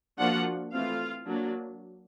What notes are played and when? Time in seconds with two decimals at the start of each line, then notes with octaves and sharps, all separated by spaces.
0.18 F3 A#3 D4 F4 F#4 F#5
0.72 E3 A3 C4 F4 F5
1.27 F#3 A#3 D4